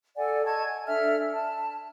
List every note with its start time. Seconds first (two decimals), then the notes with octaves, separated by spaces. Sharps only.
0.15 A4 D5 F#5 G#5
0.45 D#5 A5 C#6 G#6
0.65 G#5
0.86 D4 A4 E5 F6
1.32 A5